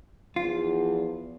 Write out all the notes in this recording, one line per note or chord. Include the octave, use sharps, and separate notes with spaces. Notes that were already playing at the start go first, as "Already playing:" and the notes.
E2 F3 F4